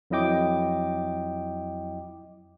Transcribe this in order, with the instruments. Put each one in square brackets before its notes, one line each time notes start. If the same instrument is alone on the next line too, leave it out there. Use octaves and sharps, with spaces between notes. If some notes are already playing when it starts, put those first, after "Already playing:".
[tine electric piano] F2 F#3 E4 D#5 G5 D6